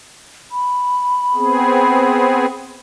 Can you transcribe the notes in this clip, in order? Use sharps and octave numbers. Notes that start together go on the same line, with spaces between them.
B5
B3 C4 G#4